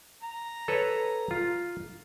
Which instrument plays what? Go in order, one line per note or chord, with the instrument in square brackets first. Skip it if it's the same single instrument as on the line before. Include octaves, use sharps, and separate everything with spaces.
[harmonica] A#5
[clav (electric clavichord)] A4 B4 C#5
F4